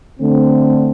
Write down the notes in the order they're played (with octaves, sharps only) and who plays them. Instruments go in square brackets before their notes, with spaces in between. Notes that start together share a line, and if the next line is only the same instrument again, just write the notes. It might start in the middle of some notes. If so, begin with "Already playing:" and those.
[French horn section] D3 A3 C4